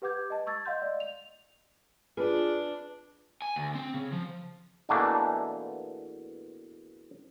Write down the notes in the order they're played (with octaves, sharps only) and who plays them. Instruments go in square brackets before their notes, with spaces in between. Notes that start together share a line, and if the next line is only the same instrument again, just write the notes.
[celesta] G4 B4 F#5 D6 G6 G#6
D#5 A5
C#6 E6 G#6 A6
D#5 F5 F#5 C6 G6
D5 D#5
F7
[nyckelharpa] D4 [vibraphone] F4 [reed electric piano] G#4 [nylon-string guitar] B4
[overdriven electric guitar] G#5
D2
C4
C#3
F3
[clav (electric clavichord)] E2 B2 E3 A3 A#3 D4